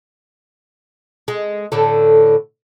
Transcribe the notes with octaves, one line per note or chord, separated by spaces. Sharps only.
G#3
A2 D3 A4